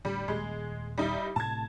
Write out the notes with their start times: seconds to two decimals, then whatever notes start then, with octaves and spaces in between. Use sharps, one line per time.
0.05 A2 D3 G3
0.28 D#1 G#3
0.98 G3 D#4 E4
1.36 A2 C3 A3 A5 G#6